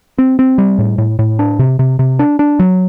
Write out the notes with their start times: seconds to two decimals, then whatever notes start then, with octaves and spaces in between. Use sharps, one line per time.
0.18 C4
0.39 C4
0.58 G3
0.79 A2
0.98 A2
1.19 A2
1.39 D4
1.59 C3
1.79 C3
1.99 C3
2.19 D4
2.39 D4
2.59 F#3